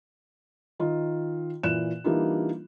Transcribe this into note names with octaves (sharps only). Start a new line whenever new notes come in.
D#3 F4 D#5
A#2 E3 F#6 E7
E3 G3 A#3 D4 D#4 F4